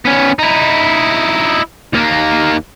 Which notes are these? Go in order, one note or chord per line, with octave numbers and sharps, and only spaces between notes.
B3 C#4
D#4 E4
D#2 A#3